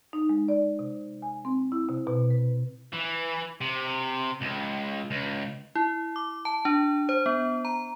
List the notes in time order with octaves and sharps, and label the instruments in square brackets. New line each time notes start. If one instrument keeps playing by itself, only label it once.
[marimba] D#4
G#3
D5
C3
G#5
C4
E4
C3
B2
B4
[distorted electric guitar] E3
C3
C#2
C#2
[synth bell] E4
D6
A5
D4
C5
B3
A#5